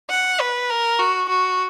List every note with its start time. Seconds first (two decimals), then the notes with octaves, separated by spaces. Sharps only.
0.10 F#5
0.40 B4
0.70 A#4
0.99 F#4
1.29 F#4